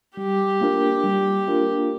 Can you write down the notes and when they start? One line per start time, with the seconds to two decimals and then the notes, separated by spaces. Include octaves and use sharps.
0.17 G3 G4
0.61 A#3 D4 F4 A#4
1.04 G3
1.48 A#3 D4 F4 A#4